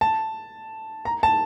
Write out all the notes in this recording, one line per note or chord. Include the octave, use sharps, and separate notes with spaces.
A5
A#5
A5